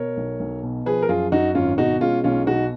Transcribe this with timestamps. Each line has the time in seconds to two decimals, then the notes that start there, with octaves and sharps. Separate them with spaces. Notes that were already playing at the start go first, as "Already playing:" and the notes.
Already playing: B2 A#4 C#5
0.17 B1
0.40 B1
0.63 B2
0.86 F3 G#4 B4
1.02 A#4
1.09 F#2 F4 G#4
1.32 F#2 D#4 F#4
1.55 G#1 C#4 F4
1.78 B2 D#4 F#4
2.01 G#3 C#4 F4
2.24 B1 C#4 F4
2.47 B2 D#4 F#4